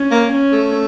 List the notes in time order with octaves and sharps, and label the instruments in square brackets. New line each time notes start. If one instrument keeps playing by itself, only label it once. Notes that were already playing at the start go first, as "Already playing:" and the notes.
Already playing: [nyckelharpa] C#4
[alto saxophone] A#3
[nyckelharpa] C#4
[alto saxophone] A3